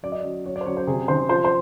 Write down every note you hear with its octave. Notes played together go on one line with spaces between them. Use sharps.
F#3 D5
D#5
F#3 D5
F#3 C#5
D5
C5
F#3 C#5
C5
C3 G#4
D#3 C5
F3 C5
C5